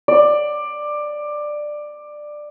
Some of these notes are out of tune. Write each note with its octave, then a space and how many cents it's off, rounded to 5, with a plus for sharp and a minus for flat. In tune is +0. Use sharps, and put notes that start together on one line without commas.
D5 +15